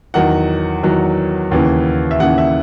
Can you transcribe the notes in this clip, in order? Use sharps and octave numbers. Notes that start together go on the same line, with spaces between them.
E2 D#3 F#3 F#5
E2 D#3 F#3
D#2 C#3 E3
E5
D#2 C#3 E3 F#5
E5